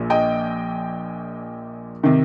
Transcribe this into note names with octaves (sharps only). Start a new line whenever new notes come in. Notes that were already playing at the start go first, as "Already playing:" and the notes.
Already playing: A#1 A#2
D#5 G5
C3 D#3